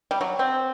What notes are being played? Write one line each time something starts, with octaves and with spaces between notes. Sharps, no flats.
G3
F#3
C4